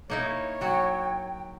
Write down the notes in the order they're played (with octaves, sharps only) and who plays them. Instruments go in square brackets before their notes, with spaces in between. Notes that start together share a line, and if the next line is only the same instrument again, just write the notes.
[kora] A#3 D#4 E4 [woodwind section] C#5
[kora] F#3 F#4 [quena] G5